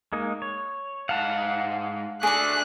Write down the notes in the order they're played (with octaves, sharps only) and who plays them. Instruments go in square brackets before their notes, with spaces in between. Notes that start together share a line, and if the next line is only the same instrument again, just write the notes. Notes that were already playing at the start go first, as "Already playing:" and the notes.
[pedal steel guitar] G#3 A#3 D#4
C#5
[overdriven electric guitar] G#2 F#5 [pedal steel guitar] F5 A5
[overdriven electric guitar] A3 D4 [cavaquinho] G#4 D5 [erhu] F#6